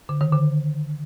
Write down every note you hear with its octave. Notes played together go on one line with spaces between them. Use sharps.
D3
D#3
D3